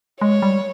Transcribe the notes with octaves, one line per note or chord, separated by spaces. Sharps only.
G#3 C#5
G3